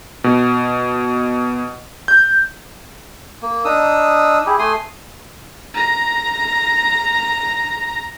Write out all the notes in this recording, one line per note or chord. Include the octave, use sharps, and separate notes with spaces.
B2
G6
A#3
D4 D#4 D#6 E6
E4 G4 G#4
A3 G#5 C6 D#6
A#5 A#6